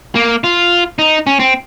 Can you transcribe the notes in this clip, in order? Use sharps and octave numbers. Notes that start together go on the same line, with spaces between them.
A#3
F4
D#4
C#4
C4